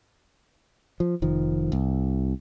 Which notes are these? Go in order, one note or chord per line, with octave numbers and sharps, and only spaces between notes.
F3
F1 D#3 F3
C2